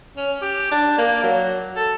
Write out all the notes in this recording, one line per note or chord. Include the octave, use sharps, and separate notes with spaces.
C#4
G4
D4
A#3
F#3
A4